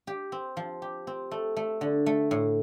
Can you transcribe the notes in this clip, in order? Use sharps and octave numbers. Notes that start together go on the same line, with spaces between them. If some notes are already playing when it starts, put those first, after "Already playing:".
G4
C4
F3
G4
C4
A3
A3
D3
A3
A2